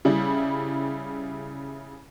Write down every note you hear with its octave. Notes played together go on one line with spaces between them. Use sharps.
C#3 G3 E4